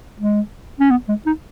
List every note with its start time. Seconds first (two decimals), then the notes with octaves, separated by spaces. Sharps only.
0.19 G#3
0.80 C#4
0.91 B3
1.09 G#3
1.26 D#4